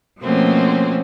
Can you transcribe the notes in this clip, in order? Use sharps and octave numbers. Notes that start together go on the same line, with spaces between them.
B2 F3 A3 A#3 C4 C#4